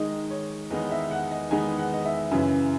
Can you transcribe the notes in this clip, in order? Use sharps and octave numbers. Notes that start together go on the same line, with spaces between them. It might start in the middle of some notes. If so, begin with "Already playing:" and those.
Already playing: D#3 G#3 D#4 D#5
C#5
E2 D#3 G#3 B3 D#4 D#5
E5
F#5
D#5
E2 D#3 G#3 B3 D#4 G#5
F#5
D#5
E5
F#2 C#3 E3